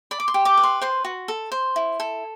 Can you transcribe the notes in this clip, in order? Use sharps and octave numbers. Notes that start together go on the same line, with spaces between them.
D5 B5
D6
C6
G4
D6
B4
C6
C5 C6
F#4
A4
C5
E4
A4